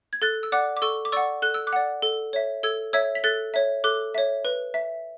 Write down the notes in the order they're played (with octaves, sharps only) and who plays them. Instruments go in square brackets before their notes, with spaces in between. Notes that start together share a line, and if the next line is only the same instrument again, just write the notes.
[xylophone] G#6
A4 F#6 A6
E6
D5 F#5 D6 F#6
D6
A4 C#6 E6
D6
D5 F#5 C#6 E6
A4 F#6
E6
D6 F#6
D5 F#5
A4
C#5 E5
A4 E6 G#6
C#5 E5 E6 G#6
B6
A4 F#6 A6
C#5 E5
A4 D6 F#6
C#5 E5
B4
E5